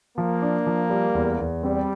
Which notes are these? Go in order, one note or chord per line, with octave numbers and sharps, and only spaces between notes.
F3 A#3
D4
F3
G3
E2
E2
G3 C4